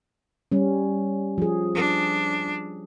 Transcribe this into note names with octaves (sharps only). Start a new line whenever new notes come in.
G3 C#4
F3 G#4
D4